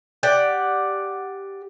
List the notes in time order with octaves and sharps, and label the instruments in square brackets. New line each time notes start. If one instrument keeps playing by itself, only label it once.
[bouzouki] G4 D5 F#5